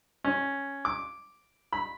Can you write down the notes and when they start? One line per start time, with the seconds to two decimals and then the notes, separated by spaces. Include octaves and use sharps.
0.24 C#4
0.85 D6
1.73 B5